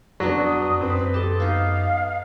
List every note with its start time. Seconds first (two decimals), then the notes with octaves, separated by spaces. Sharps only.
0.20 F2 F#3 B3 D4 F#4 D#5
0.45 D#6
0.81 F#2 C4 B4
1.14 G4 A4 D#5 A5
1.40 B3 D#4 F5